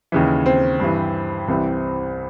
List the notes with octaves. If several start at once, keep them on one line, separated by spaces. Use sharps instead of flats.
D#2 C#3 E3
C4
G2 E3
C2 C3 E3